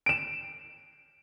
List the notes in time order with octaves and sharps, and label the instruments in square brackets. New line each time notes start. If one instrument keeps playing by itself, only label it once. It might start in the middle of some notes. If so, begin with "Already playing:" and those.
[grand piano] D7 E7